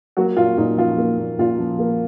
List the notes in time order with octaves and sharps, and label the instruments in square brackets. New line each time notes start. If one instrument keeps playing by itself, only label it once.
[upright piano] F#3 A#3 F#4
A#2 F4
A#2 D#4
F3 F4
A#3
A#2
A#2 F4
F3
A#3